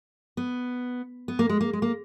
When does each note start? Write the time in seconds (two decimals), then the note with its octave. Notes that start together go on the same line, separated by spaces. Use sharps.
0.37 B3
1.28 B3
1.39 A#3
1.49 G#3
1.61 A#3
1.73 G#3
1.82 A#3